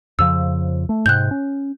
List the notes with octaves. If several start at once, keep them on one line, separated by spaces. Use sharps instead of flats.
F2 C#3 F3 E6
A3
G#2 C3 F#6 G6
C#4